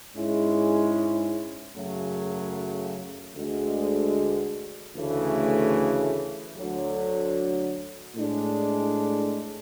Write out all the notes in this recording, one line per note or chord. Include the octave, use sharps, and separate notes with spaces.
G#2 G#3 C#4 E4
F#2 C#3 F#3 A3
D2 D3 G#3
D2 C#3 E3 A3
D2 D3 F#3
A2 G#3 D4